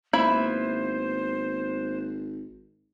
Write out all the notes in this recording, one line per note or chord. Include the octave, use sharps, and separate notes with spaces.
G#1 A#3 B3 E4 C5 E5 B5